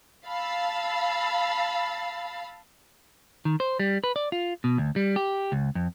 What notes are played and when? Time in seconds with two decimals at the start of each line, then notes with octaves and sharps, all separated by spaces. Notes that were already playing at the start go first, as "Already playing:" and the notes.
0.27 F5 A5 B5 E6 A6 C7
3.45 D#3
3.60 C5
3.79 G3
4.04 B4
4.16 D5
4.32 F4
4.64 B2
4.78 D2
4.96 G3
5.16 G4
5.52 C#2
5.75 F2